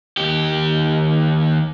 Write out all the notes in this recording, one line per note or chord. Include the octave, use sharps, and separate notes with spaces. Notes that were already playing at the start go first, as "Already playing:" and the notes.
D#2 G4